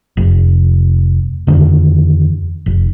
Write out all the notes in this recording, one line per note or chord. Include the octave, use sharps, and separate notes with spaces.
F1
F2 D3 D#3
F1